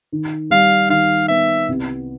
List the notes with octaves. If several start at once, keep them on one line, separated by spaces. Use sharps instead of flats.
D#3
G3 F5
D#3 F5
B3 E5
C2